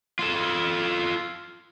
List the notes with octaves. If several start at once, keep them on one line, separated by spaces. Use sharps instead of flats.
F4 A4